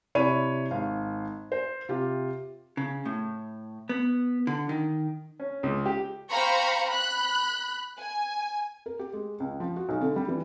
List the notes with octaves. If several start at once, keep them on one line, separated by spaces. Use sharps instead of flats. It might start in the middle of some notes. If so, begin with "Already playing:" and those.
C3 E4 C#5 D5 B5 D#7
G#1 F5
C5
C3 F4 G4
C#3
A2
B3
D3
D#3
C#4
C#2
G4
C5 F5 G5 A#5 B5 C#6
B5 F#6
G#5
A#4
G4
G#3
C#2
F3
F#4
B1
D3
G3
E3